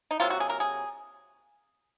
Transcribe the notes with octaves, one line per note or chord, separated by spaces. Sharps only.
D#4
C3 F#3 A#3 F4
F#4
G#4
A#4
G#4